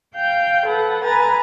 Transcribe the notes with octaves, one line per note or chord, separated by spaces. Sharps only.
F5 G5 G6
A4 B4 F#5
B4 G#5 A#5 A6